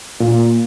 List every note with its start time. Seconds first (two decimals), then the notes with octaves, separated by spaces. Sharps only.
0.20 A#2